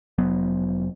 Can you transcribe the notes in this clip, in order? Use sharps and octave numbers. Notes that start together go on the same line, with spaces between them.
F1 F#3 B3